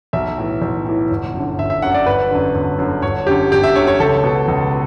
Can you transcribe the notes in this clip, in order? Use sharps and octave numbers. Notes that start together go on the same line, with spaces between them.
B1 E5
A2 E3
B1
A2 E3
G1
F#2
D3
G1 E5
E5
F#2 D3 F#5
D5
G1 B4
F#2 D3
G1
F#2 D3
G1 C#5
F#2 D3 G4
G1 G4
E5
F#2 D3 C#5
C#5
C#2 A4
B2
C#2